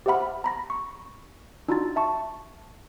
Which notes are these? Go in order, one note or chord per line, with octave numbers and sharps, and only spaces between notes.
G4 C5 E5 F#5 B5 F6
A#5 B5 A#6
C#6
D4 D#4 F4 F#4 A#5 A6
E5 A5 C#6